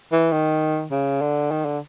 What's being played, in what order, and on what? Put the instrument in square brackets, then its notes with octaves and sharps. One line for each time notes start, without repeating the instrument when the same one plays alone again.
[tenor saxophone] E3
D#3
C#3
D3
D#3
D3